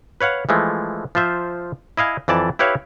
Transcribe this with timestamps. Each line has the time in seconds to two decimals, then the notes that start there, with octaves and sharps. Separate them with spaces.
0.21 B4 C#5 F5 F#5
0.49 E3 F3 G#3 A3
1.15 F3 F4 C5 E5
1.97 E4 D#5 F5 G#5
2.28 F2 E3 D5 A5
2.59 E4 G4 B4 C#5 E5 F5